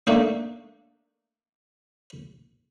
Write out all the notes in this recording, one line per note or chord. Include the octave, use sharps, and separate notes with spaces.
A3 A#3 D4 D#4